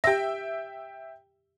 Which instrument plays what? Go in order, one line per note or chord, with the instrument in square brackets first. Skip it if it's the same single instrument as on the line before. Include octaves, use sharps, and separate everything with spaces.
[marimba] G4 A#6 [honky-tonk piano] E5 G5